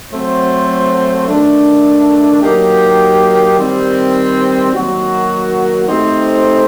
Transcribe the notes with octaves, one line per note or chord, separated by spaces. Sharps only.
F#3 A3 C4 F#4 C5
D#3 A3 D4
F#3 A#3 D#4 G4
D#3 G3 C4
D#3 F#3 A#3 F#4
A3 C4 D#4 G4 C5